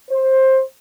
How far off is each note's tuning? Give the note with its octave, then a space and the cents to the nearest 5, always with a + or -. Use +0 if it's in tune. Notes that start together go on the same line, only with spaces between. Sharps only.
C5 +15